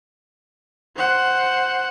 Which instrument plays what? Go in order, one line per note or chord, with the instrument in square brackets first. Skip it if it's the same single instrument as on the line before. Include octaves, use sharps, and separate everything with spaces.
[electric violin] C5 F#5